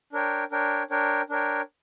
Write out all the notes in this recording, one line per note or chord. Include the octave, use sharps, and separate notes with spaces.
D4 A#4 C#5 G5
D4 A#4 C#5 G5
D4 A#4 C#5 G5
D4 A#4 C#5 G5